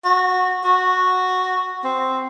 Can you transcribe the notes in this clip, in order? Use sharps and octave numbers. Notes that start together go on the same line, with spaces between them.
F#4
F#4
C4